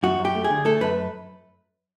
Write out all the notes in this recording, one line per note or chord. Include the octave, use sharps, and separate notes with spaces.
F#2 F#4
F#2
G4
A3
G#4
D3
A3 A4
F#2 B4